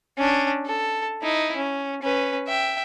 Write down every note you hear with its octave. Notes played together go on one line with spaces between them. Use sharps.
C#4 D4
A4
D#4 E4
C#4
C#4 B4
E5 G5